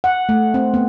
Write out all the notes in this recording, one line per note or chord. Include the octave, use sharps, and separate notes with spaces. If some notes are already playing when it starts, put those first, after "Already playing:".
F#5
A3
C4
B3